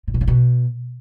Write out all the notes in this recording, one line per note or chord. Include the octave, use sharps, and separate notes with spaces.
A#2
B2
C#3
B2